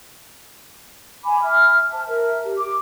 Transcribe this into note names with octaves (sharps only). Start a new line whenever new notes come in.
G#5 B5 D6
E5 F6
C5 A5
A#4 E5
G4
D6